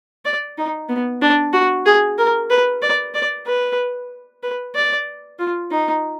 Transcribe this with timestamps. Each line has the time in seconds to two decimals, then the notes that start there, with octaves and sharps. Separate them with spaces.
0.25 D5
0.58 D#4
0.89 B3
1.22 D4
1.53 F#4
1.86 G#4
2.18 A#4
2.50 B4
2.82 D5
3.14 D5
3.46 B4
4.43 B4
4.75 D5
5.39 F4
5.71 D#4